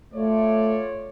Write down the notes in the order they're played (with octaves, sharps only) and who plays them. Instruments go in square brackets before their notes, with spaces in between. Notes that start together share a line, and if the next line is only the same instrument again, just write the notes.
[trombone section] A3 [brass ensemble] F4 C#5 D5